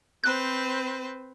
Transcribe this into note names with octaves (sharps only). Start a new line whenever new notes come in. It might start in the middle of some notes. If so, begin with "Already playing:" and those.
C4 B4 C5 F#6